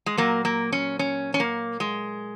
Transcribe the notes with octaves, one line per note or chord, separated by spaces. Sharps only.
G#3
A#2 F#3 A#3
A#3
C#4
C#4
C#4
A#3
G#3